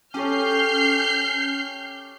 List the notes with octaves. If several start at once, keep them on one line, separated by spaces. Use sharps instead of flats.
C#4 G4 A4 C#5 F6 G6 C7